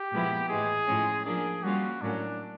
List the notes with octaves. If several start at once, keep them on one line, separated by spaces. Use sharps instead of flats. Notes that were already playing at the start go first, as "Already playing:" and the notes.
Already playing: G4
A#2 F3 G#3 B3 E4
A2 E3 G#3 G#4
A2 F3 G#3 C#4
F3 A#3 D4 G#4
G3 A#3 C#4 F4 F#4
A2 F#3 A#3 C#4 D4